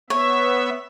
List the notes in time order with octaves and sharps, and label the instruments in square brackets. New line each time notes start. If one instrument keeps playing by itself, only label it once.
[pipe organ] B3 E5 [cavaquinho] C#5